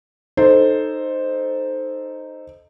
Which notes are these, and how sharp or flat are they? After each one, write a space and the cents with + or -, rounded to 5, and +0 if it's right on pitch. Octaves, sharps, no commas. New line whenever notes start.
D#4 -10 A4 +0 C5 +0